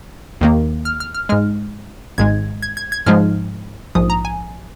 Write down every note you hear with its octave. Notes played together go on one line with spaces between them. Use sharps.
D#2 D#3 A#3
F6
F6
F6
G#2 G#3 F6
G#1 G#2 G#3 G#6
G#6
G#6
G#6
G#2 F3 G#3 F6
A#1 G#2 F3 D#6
A#5
G#5